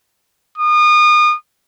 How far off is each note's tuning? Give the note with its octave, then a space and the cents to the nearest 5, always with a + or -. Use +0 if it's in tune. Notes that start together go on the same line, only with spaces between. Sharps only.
D#6 -35